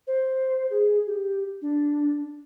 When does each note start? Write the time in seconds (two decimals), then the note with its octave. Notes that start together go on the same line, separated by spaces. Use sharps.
0.07 C5
0.70 G#4
1.07 G4
1.62 D4